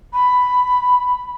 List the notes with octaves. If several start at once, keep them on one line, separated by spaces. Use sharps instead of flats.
B5